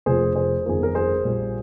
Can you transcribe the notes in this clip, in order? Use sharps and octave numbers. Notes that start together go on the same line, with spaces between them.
F1 F2 C3 F3 A#3 G#4 C5
G#4 C5
G1 F2 D#3 A#3 G#4
A#4
G#4 C5
A#1 A#2 G3